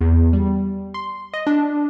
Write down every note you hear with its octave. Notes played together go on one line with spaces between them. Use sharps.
E2
G3
C6
D#5
D4